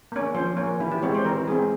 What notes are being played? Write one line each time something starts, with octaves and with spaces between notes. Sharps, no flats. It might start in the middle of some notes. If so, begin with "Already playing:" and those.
A#3 C#4
F3 C5
A#3 C#4
E3 E4
G4
G#3 C4 C#5
C5
E3 A#4
G#3 C4 G#4